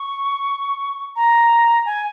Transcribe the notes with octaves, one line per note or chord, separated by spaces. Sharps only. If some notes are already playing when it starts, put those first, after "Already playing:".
Already playing: C#6
A#5
G#5